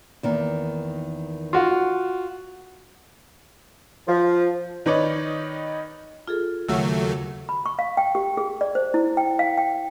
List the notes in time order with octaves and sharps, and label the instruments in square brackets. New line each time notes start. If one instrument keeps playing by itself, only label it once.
[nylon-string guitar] E2 D#3 A#3
[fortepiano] F4 F#4
[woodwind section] F3
[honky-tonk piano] D#3 D#4 B4 C#5 D5
[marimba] F4 G#4 A4
[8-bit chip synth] D#2 F#3 A3 [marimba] C#3 F#5 E6
[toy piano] B5
C#6
F5
G5
G4
G#4
D5
C5
E4
G5
F5
G5